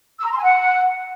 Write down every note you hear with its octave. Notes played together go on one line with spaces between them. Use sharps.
E6
A#5
C6
G#5
F#5